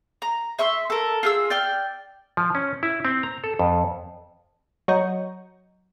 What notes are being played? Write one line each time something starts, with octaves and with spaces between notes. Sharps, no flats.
A#5
E5 C6 C#6 E6
A4 A#4
F4 G#4 E6
D5 G5 F6
F3
C#4
E4
C4
A#5
A4
F2
F#3 C#5 D#5 A#5 G6 C#7